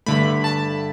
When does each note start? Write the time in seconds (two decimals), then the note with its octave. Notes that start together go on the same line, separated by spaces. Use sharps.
0.06 G2 D3 A3 B5
0.44 A5